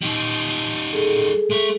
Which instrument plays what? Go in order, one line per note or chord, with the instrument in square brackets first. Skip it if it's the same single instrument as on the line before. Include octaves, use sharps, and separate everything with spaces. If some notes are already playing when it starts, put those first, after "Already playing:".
[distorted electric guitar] G3 D#4
[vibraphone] G#4 A4
[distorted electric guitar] G#3 E5